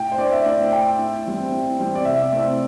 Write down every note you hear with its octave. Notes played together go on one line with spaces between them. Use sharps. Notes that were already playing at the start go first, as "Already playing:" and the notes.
Already playing: A2 G5
C5
A3 D4 D5
E5
A2 D5
A3 D4 G5
A2
E3 G3 C4
A2
E3 G3 C4
D5
C3 E5
A3 C4 E4 D5